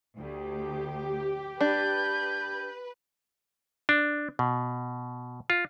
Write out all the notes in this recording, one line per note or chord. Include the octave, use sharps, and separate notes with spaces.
D2 G4
D4 B4 G6
D4
B2
F4